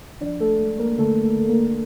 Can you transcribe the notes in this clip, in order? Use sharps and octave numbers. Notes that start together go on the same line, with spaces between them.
F3 D4 D5
A3 A4
G#3 A3 A4
A#3 A#4
D3 A3 A4
A3 A4
D3
A#3 A#4